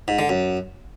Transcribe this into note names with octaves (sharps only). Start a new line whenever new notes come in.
G#2
D3
F#2